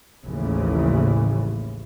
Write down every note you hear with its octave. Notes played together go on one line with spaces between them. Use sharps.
A1 D#2 C#3 E3 F3